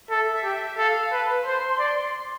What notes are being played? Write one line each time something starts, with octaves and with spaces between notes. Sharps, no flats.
A4 E5
G4
A4 F5
B4 A5
C5 C6
D5